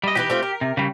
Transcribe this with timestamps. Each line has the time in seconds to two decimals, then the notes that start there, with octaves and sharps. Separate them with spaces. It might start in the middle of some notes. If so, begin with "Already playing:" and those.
0.04 G3 D#5
0.15 E3 D#4 G4 B4
0.30 A3 C4 F4
0.43 A#4
0.61 C3
0.77 C#3 G3